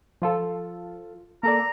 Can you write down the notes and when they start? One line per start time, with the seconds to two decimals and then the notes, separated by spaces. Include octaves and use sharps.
0.22 F3 F4 A4
1.43 A#3 A4 D5 A#5